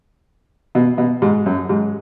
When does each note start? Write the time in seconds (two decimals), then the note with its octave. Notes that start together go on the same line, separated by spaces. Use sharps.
0.75 B2
0.98 B2
1.22 G#2
1.46 F#2
1.69 G#2